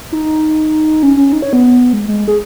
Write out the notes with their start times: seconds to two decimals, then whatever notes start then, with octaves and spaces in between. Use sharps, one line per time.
0.12 D#4
1.03 C#4
1.17 C#4
1.33 D#4
1.42 C#5
1.53 B3
1.93 G#3
2.08 G#3
2.28 G#4